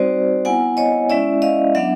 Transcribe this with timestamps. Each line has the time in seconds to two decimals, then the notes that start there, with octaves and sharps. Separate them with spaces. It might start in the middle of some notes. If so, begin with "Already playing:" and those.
Already playing: G3 C4 D#4 F#4 C5 D5
0.45 B3 E4 F#5 G#5
0.77 C#5 D#5
1.10 G#3 C#4 E4 D5 E5
1.42 D#5 F5
1.75 F#3 B3 D4 E5 F#5